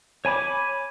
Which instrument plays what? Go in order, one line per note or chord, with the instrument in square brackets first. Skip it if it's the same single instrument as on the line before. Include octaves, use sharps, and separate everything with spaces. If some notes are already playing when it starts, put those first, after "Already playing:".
[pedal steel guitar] C#5 G#5 B5 D6